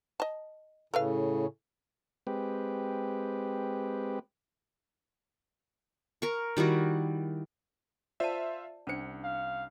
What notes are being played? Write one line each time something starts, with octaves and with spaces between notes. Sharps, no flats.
D#5 A5
A2 C#3 A4 B4 F5
G#3 C4 G4 B4
A#4 C#6
D#3 G3 E4 F#4
F4 C5 D5 E5 A5
C2 C#4 D4 C5 C#7
F5